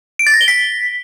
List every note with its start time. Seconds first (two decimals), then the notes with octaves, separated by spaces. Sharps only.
0.19 D7
0.26 A6
0.34 A#6
0.41 G7
0.48 B6